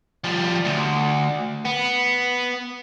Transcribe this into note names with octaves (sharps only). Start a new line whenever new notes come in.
F3 G3
D2
B3